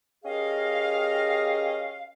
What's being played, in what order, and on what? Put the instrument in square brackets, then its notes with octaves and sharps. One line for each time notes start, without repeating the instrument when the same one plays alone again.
[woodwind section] C#4 G4 G#4 A#4 D#5 F5